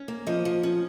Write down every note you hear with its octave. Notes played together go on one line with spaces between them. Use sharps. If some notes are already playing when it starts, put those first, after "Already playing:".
Already playing: C#4
A#3
F3 D#5
F3
C#4